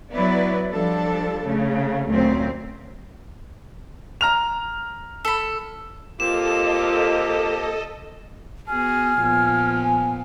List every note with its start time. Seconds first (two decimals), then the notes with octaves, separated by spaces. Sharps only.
0.14 F#3 B3 E4 B4 D5
0.72 F3 G3 D4 A4
1.47 C#3 A3
2.09 D2 A#2 F#3 C4 C#4
4.21 A#5 F6 F7
5.25 A4 B5
6.20 A#3 C4 F4 G4 A4 D#5 E7
8.68 B3 F#4 G#4 G#5 F6
9.20 A#2 F3 B3
9.83 G#5